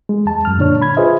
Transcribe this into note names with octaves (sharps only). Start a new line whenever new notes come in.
G#3
E2 A5
F#2 F6
A#2 D3 D4 C#5 F6
B5 G#6
F4 G#4 B4 C5 D#5 E5